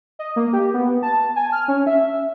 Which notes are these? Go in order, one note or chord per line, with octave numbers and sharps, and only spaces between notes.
D#5
A#3
G4
B3
A5
G#5
F6
C#4
E5